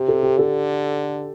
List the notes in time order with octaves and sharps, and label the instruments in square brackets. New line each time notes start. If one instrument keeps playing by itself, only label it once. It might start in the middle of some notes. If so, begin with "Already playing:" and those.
Already playing: [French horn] C3 [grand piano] G4
[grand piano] A4
G4
[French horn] D3 [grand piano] A4